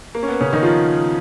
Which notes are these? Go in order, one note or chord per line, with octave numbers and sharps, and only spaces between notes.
A#3
C#4
B3
C#3 C#4
D#3 D#4
F3 F4